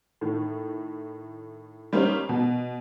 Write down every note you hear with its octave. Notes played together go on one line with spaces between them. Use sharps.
A2 D#3
G3 A#3 C#4 D#4 C5
B2